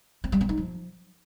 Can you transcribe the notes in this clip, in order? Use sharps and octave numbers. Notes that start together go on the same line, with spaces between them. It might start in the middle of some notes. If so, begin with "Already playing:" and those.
C4
G3
C4
D#4
F3